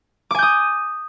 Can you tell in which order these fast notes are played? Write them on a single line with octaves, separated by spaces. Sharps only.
D6 G#5 G6 D#6